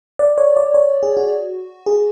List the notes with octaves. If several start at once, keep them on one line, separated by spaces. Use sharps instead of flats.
D5
C#5
D5
C#5
G#4
F#4
G#4